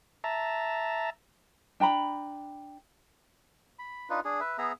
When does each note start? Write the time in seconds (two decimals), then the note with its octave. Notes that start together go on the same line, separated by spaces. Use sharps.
0.24 E5 A5 A#5
1.80 D4 G5 A#5 B5
3.79 B5
4.10 D4 D#4 F4 B4
4.25 D4 G#4
4.40 B4 E5
4.58 B3 G#4 E5 A#5